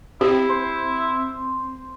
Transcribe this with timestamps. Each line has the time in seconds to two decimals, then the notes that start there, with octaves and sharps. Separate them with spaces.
0.21 C4 E4 G4
0.49 C5